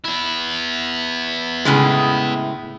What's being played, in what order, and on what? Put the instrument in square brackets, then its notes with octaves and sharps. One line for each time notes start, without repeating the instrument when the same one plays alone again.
[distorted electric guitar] B3 E4
[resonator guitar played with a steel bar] A2 C#3 G#3